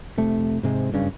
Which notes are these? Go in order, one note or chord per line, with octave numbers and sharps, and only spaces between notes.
F1 C3 A3
G#2 C3 G#3
F#1 G2 C#3